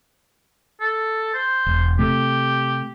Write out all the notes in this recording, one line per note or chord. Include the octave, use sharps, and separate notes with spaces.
A4
C5
E1
C3 A3 G4